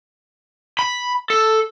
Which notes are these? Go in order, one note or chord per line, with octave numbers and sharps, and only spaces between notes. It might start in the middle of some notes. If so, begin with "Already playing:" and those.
B5
A4